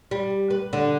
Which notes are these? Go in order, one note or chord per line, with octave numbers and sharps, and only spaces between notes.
G3
B4
D3